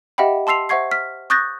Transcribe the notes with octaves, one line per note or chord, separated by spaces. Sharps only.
G4 D#5 E5 F#5 G5 B5
A5 C6 E6 C7 F7
C5 E5 F#5 C#6 G#6 C7
F6 B6
C#6 D#6 F#6 G6 A6 A#6